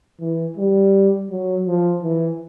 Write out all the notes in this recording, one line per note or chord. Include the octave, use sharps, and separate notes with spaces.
E3
G3
F#3
F3
E3